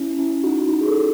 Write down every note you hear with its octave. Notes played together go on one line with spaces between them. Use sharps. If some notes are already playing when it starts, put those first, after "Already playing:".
Already playing: C#4 E4
C#4 E4
D#4 F#4
D#4 F#4
G#4
F#4 A4